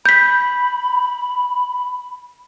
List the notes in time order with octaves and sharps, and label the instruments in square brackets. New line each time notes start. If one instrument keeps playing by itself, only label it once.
[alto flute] B5 [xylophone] G6 B6